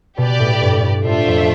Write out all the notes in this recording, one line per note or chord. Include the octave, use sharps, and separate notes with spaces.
B2 G4 B4 D5
A2
G2
A2
G2
A2 A3 D4 F4 C5 E5
F2